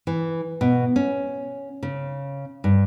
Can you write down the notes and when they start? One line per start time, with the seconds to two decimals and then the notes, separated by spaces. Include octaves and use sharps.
0.07 E3
0.61 B2
0.96 C#4
1.83 C#3
2.64 G2